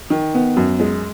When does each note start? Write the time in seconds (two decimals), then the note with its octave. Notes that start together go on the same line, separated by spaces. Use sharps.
0.10 D#3
0.34 B3
0.57 F#2
0.80 G#3